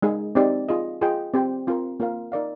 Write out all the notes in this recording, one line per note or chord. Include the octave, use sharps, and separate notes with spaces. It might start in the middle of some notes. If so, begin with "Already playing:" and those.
G#3 D#4 G#4
C4 D#4 G4 D5
F4 G#4 D#5
F4 G#4 D#5 G5
C4 G4 C5 G5
C4 F4 A#4
A#3 F4 A#4 F5
D#4 A#4 D5 F5